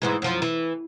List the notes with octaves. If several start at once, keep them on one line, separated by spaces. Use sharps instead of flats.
G#2 E3 G#3
F#2 F3
E3